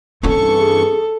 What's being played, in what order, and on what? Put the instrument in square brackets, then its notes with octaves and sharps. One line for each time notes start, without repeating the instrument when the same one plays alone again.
[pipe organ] G2 E3 C#6 [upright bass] C4 C#4 [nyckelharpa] A4
[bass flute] G#4